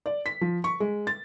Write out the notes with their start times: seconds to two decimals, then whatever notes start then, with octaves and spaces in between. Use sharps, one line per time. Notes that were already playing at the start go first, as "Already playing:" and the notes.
0.06 D5
0.26 B6
0.41 F3
0.64 C#6
0.80 G#3
1.07 A6